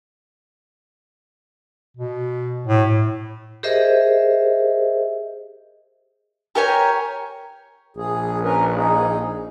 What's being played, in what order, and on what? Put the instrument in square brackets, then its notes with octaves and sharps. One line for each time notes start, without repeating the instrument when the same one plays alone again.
[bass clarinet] B2
A2
[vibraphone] G4 G#4 A#4 C5 D#5 E5
[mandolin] G4 A#4 C#5 G#5
[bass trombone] A#1 [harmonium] G#4
[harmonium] C#4 A#4 B4
D#4 G#4